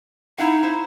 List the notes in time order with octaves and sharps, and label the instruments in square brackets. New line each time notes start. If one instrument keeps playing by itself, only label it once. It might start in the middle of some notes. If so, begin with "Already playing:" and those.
[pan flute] D#4 [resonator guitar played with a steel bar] E4 F5 F#5
[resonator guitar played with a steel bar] E4 C5